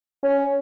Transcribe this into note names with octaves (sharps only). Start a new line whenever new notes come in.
C#4